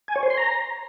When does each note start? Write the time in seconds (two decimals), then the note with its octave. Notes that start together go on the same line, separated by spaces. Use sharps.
0.08 G#5
0.16 C#5
0.23 C5
0.30 C6
0.37 A#5